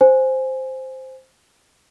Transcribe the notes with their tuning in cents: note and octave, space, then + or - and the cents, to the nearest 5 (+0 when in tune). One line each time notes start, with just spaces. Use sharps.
C5 +0 G#5 +0